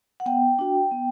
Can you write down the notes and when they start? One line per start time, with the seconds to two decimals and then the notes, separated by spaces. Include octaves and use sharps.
0.20 F#5
0.26 B3 G5
0.59 D4 F#4
0.92 B3